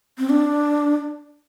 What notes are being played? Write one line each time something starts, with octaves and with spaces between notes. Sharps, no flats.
C4
D4